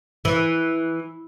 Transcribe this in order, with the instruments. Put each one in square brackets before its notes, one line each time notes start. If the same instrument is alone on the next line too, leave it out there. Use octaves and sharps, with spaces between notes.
[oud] E3